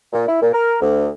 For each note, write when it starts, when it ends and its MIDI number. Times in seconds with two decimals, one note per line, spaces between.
0.13 0.26 46
0.28 0.38 64
0.41 0.49 46
0.53 0.75 70
0.81 1.09 38